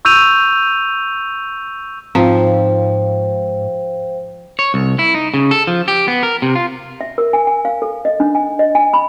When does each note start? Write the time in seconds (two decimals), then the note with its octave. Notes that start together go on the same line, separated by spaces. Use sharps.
0.05 C#6 E6 G6 D#7 F7
2.15 G#2 F3 C4 F4 C5 F5 G5
4.59 C#5
4.74 C2
4.99 E4
5.15 D#4
5.34 C#3
5.51 A4
5.67 F3
5.88 G4
6.08 B3
6.23 A#4
6.42 C3
6.55 F4
7.01 E5
7.18 A#4
7.33 G#5
7.47 G#5
7.65 F5
7.82 A4
8.05 D#5
8.20 D4
8.35 G#5
8.59 D#5
8.75 G#5
8.94 B5